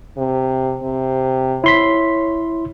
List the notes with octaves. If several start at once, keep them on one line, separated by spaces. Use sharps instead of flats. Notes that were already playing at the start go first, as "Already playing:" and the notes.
C3
C3
E4 C#5 C6 B6